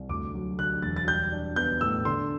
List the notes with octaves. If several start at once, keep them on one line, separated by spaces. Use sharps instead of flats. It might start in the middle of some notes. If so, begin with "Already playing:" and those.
Already playing: C2
D2 D6
F#3
D3 F#6
E1 A6
A6
G3 G6
D4
B3 G6
A2 E6
D3 C6